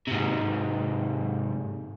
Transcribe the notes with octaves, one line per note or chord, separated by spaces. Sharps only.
G#2 C3